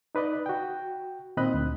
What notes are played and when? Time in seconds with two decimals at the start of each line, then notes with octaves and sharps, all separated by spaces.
0.15 D#4 B4 D5 D#5
0.46 F#4 G5
1.37 A#2 D#3 C4 D#5 B5 F#6
1.54 D2